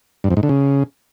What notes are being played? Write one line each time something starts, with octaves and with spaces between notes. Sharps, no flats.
G2
F2
G#2
D3
C#3